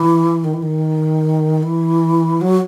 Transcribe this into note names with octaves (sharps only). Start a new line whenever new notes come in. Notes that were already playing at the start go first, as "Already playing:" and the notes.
Already playing: E3
D#3
E3
D#3
E3
F#3